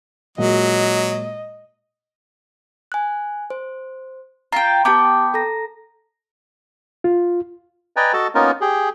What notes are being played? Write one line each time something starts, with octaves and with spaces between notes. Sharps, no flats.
A#2 F#3 G#3 F#4 D#5
G#5 F#6
C5
F4 G5 A#5
B3 G4 G5 A5 D6
A4 A#5 A#6
F4
B4 D5 D#5 G5 G#5 A#5
F#4 A4 D#5 A5
A#3 B3 C#4 D#4 F4 A#4
G4 G#4